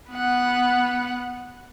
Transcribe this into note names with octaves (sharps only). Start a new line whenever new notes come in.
B3 F#5